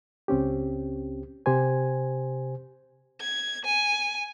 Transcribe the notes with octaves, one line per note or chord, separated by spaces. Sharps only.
C#2 C4 C#4 G4
C3 G4 C5 G#5
G#6
G#5